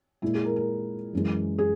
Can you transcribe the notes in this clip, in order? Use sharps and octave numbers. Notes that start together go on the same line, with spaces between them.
A#2 G#3 E4
G#4
A#4
A#4
F#2 E3 G#3
G#4